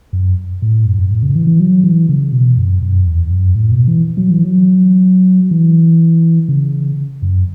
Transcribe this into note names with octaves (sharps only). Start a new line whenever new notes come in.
F#2
A2
F#2
F#2
A2
C#3
E3
E3
F#3
E3
C#3
B2
F#2
F#2
E2
F#2
A2
B2
E3
F#3
E3
F#3
E3
C#3
F#2